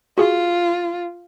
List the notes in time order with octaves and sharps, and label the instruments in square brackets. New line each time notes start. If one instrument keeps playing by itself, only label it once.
[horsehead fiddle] F4 [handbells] F#4 G#4